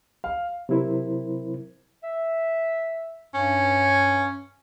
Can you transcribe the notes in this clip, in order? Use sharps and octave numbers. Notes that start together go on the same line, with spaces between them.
F5
C3 F#3 C4 E4 A#4 C5
E5
G2 C#4